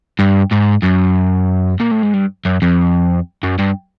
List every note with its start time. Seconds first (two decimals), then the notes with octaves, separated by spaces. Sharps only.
0.19 G2
0.52 G#2
0.83 F#2
1.80 A#2
1.91 A2
2.03 G#2
2.13 G2
2.45 F#2
2.62 F2
3.43 F#2
3.59 G2